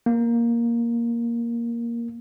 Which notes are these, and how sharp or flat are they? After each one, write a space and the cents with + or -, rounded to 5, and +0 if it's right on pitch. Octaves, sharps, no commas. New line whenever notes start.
A#3 +5